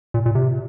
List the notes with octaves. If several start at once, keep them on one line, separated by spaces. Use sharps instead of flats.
A#2
A#2
C3